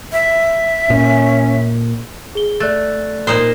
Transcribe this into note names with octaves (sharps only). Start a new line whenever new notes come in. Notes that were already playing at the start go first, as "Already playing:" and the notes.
E5
A#2 C#4
G#4 G7
A3 D5 F#6 A6
A#2 D#4 C5